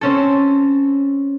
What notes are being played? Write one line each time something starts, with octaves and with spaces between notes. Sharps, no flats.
C4 C#4 A4